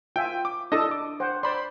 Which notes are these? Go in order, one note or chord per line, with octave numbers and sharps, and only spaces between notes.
F4 E5 G5 G#5
D6
D4 E4 A4 D#5 A5 D#6
D6
C5 F#5 G5
C5 D5 B5 C6